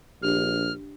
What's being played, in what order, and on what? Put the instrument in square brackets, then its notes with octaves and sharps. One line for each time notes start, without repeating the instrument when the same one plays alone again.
[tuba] A#1 [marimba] D4 G4 [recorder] F6